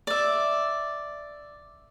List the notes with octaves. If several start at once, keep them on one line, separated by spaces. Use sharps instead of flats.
D5 E5